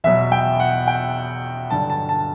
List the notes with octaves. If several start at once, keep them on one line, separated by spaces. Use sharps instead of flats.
E2 B2 F#3 E5
G5
F#5
G5
G2 D3 F#3 A5
A5
A5